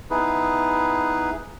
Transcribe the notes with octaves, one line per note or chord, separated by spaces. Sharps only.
B3 D#4 E4 G#4 B4